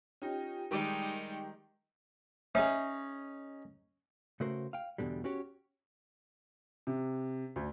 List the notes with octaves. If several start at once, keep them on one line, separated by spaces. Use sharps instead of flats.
C#4 D#4 F4 G4 G5
D#3 G3 G#3 D#4 G4 G5 D6
C#4 D#4 G#4 E5
C#3 A3 F#4 A#4 C5
F5 G5
E2 G#2 B2 D3 G3
C#4 F#4 G4 C#5
C3
D2